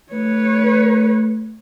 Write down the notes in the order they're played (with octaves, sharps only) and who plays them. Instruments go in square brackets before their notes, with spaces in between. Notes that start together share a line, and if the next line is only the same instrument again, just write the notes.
[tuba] A3 [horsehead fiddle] B4 C#5